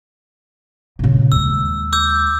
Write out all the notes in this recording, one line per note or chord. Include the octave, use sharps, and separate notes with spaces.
A#2 C#3
D#2 G#3 E6
D6 E6 G6